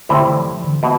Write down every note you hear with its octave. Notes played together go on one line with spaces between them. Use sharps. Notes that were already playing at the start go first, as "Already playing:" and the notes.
A2 D3 G3 C4 E4
E3
E3
D3
B2